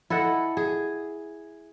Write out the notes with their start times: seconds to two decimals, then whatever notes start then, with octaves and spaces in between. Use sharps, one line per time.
0.10 E4 A4 D#5 F#5
0.57 G#4